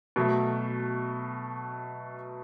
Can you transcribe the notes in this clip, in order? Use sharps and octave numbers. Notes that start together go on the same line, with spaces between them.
B2 F#3 A3